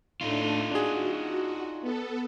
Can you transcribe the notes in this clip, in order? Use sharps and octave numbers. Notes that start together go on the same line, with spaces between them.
A2 A3 D4 D#4 F4
D4 F#4 G#4
B3 A4